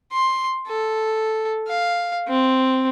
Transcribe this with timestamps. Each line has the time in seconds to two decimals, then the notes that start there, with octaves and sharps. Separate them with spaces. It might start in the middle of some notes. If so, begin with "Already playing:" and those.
0.13 C6
0.68 A4
1.69 F5
2.28 C4